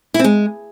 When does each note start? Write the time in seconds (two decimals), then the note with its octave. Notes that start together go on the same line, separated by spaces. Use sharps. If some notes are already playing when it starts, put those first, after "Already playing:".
0.14 E4
0.19 C4
0.24 G#3